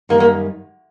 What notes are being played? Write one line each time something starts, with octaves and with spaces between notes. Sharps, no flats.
F#2 D#3 G3 A#3
A#3